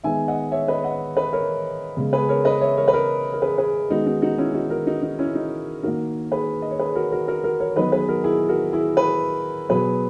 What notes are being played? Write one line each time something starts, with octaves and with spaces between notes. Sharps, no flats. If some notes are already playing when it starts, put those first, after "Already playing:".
D#3 G#3 B3 E5 G#5
D#5 F#5
C#5 E5
B4 D#5
D#5 F#5
B4 D#5
A#4 C#5
C#3 G#3 B3
G#4 B4
A#4 C#5
B4 D#5
C#5 E5
A#4 C#5
B4
A#4 C#5
A#4
G#4 B4
G#4 B4
D#3 G#3 B3 D#4 F#4
D#4 F#4
D#4 F#4
C#4 E4
D#4 F#4
F#4 A#4
D#4 F#4
D#4
C#4 E4
D#4 F#4
D#3 A#3 F#4 A#4
G#4 B4
D#5
C#5
G#4 B4
F#4 A#4
F#4 A#4
F#4 A#4
F#4 A#4
A#4 C#5
D#3 F#3 B3 B4 D#5
G#4 B4
F#4 A#4
E4 G#4
F#4 A#4
E4 G#4
G#4 B4
B2 F#3 B3 G#4 B4